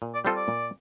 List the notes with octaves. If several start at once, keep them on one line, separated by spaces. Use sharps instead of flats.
A#2
D5
G3 C4 F4 A4 C5
D5
A#2